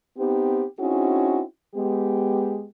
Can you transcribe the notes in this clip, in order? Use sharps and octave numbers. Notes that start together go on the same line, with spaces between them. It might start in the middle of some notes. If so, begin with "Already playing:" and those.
B3 C4 D#4 G4
C4 C#4 D#4 E4 F#4 G#4
G#3 B3 G4